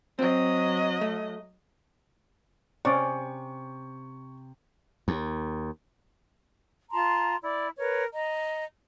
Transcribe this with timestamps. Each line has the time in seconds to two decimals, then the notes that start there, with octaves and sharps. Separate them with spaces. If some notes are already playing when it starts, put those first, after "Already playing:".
0.19 F#3 C4 D#5
1.01 A3
2.85 C3 C#4 D5 C#6
5.08 D#2
6.91 F4 A5 A#5 C6
7.42 E4 D5
7.78 A#4 B4 C#5
8.14 D#5 A#5